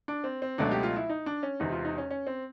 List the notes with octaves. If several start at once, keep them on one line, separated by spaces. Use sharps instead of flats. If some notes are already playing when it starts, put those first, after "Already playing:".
D4
C4
C4
C#2 B2 F#3 A3 D4
G4
F4
E4
D#4
D4
C#4
E1 E2 C3 D#4
F4
D#4
C#4
C#4
C4